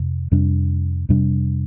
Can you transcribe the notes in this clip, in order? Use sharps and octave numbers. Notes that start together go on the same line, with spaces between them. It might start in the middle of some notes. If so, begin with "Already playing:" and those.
Already playing: F2 C3
F2 C3 G3 D4
F2 C3 G3 D4